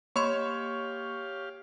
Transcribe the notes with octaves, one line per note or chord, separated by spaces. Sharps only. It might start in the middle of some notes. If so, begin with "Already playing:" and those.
A#3 G4 C#5 F5 B5 C6